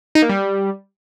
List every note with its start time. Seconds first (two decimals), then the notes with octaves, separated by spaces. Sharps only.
0.15 D#4
0.22 A#3
0.29 G3